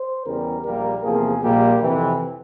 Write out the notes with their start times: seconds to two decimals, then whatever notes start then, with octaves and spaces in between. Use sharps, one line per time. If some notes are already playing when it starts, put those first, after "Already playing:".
Already playing: C5
0.25 E2 C#3 G3 A#4
0.64 A#1 A#2 G3 A#3 A#4
1.03 E2 C3 F3 A#3 G#4
1.42 A#1 A#2 G3 A#3 G4
1.81 F2 C3 E3